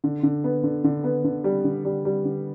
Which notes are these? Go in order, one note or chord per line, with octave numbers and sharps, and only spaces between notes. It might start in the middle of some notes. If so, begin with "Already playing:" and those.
D3
D3
B3
D3
D3
B3
D3
G3
D3
G3
G3
D3